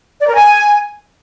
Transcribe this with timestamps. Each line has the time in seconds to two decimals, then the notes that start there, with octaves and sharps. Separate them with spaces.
0.21 D5
0.28 A#4
0.35 G#5